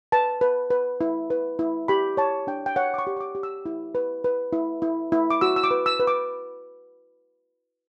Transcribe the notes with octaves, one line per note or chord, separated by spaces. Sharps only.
B4 A5
B4
B4
E4
B4
E4
G4 B5
C#5 A5
D4 G5
G5
C#5 F#5
D6
C#6
G4
C#6
D6
G4
E6
E4
B4
B4
E4
E4
E4
D6
F#4 E6
E6
D6
B4
E6
B4
D6